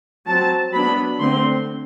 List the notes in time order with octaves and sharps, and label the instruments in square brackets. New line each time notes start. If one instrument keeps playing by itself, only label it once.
[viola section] F#3 C4 A5
F#3 B3 D4 B5
D3 A3 C4 C6